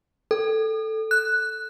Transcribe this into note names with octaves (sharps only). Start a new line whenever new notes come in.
A4
F#6